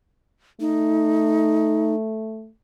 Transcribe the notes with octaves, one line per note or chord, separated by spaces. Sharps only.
A3 D#4